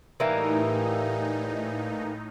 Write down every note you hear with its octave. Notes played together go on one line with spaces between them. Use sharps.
A2 E3 G3 A#3 D#4